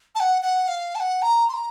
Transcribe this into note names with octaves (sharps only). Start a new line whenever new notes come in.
A5
F#5
F#5
F5
A5
F#5
A#5
C6
A#5